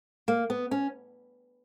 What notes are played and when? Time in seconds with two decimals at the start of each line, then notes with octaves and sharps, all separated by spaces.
0.28 A#3
0.50 B3
0.71 C#4